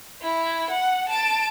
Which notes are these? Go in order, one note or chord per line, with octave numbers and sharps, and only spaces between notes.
E4
F#5
A5 D7